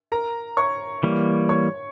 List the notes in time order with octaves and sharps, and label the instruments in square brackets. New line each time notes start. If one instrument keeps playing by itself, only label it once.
[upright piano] A#4 A#5
C#5 C#6
[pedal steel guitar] E3 G3 A#3
[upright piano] C#5 C#6